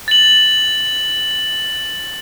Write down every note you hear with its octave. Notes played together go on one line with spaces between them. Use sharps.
A6 F#7